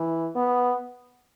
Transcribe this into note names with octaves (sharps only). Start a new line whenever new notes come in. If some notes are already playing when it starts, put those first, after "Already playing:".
Already playing: E3
B3